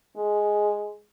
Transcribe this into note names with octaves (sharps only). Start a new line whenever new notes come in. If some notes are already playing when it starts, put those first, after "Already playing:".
G#3